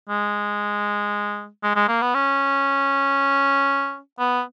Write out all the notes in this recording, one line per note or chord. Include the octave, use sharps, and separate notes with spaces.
G#3
G#3
G#3
A#3
B3
C#4
B3